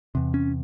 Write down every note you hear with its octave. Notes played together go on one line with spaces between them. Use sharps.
E2 C3
C#4